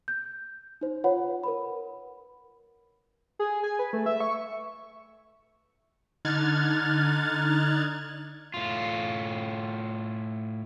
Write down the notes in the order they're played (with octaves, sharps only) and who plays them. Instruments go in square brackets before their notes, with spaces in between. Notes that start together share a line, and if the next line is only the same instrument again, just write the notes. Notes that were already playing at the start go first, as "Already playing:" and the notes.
[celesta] G6
D#4 C5
F4 B4 C#5 F#5 B5
A#4 B4 B5
[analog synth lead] G#4
G#5
B4
A3
E5
C#6
[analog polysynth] D3 D#4 F6 F#6 G#6 A6
[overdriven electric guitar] A2 F4